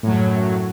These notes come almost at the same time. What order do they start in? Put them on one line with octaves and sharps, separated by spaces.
A2 F#3 F#2